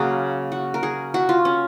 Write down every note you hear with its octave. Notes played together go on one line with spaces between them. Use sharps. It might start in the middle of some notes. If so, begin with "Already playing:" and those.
Already playing: C#3 F#3 A#3 F#4 G#4
F#4
A#4
G#4
F#4
F4
C#4